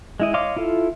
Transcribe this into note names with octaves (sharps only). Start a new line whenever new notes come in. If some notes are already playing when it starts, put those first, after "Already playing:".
G#3 E4 D#5
C#5 D#5 F5 C6 D6
E4 F4 A4